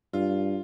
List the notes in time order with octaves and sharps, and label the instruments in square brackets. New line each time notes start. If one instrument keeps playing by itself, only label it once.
[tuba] G2 [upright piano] F4